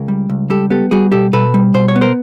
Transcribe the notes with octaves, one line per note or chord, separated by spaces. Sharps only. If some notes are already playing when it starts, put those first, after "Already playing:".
Already playing: C#2 G#4 A#4
G3
C#2
G3 G4 A4
B3 G4 A4
G3 F#4 G#4
B2 G4 A4
B2 A4 B4
G3
B2 C5
C#5
B3
A#4 C5